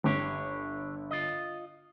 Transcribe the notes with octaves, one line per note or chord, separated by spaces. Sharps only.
G1 D3 G4 C#5
F4 D#5